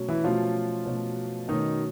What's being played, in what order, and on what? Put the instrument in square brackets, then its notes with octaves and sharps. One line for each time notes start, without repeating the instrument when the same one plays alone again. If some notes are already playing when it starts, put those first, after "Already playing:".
Already playing: [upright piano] B2 F#3 A3 C#4
[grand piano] E3 E4
[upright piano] B2 F#3 A3 C#4 [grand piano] F3 F4
[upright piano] B2 F#3 A3 C#4
[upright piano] B2 F#3 A3 C#4 [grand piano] D#3 D#4